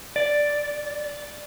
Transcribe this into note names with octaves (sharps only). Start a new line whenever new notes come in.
D5